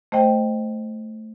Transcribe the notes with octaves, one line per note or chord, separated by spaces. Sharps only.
A3 C5 D#5 G5